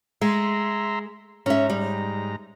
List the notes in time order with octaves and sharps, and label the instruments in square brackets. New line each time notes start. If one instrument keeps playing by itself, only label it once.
[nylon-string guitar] G#3 [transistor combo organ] E5 A#5 C6
[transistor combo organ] G#2 A#5 [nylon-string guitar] C#4 E5
[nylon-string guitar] G3